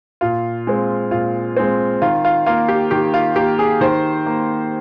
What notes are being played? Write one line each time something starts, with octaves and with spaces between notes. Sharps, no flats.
A#2 F4
G#3 C4
A#2 F4
G#3 C4
D#3 F4
F4
A#3 F4
G4
D#3 G4
F4
A#3 G4
G#4
D#3 C5
A#3